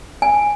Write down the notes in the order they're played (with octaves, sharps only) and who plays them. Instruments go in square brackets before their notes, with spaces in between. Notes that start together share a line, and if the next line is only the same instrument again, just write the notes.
[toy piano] G#5